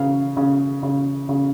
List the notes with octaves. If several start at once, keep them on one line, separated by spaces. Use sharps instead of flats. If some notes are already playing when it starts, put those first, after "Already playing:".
Already playing: C#3 F5
C#3
C#3
C#3